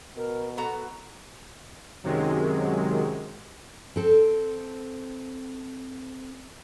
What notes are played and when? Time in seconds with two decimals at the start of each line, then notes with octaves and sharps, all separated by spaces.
0.17 B2 A#4
0.57 B3 F#4 A4 A#5
2.04 F#2 C3 D#3 F#3 G#3
3.96 C4 A4